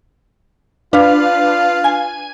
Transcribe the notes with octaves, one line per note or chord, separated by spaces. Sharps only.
D4 F4 B4 F5
G#5